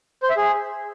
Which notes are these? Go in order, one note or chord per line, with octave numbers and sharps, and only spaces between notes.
C5
E5
G#4